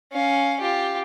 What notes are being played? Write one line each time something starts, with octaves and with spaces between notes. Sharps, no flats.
C#4 F5
F4 G4